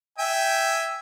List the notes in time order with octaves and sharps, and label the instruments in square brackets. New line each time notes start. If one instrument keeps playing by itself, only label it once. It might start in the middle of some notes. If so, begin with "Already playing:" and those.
[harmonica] E5 G5 G#5